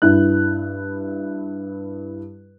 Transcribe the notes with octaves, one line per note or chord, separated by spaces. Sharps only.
G2 E4 F#6